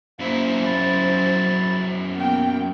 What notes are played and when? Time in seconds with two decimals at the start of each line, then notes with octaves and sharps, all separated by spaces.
0.20 F#2 A#3 E4 C5
0.65 B5 A6
2.15 A#3 B3 G5